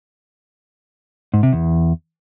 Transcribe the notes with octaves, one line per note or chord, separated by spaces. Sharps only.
G#2
C3
E2